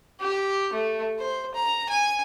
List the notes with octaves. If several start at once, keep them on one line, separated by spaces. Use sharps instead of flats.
G4
A3
C5
A#5
G#5